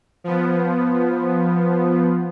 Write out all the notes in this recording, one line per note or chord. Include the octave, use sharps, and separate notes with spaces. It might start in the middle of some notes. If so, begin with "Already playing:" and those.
F3 B3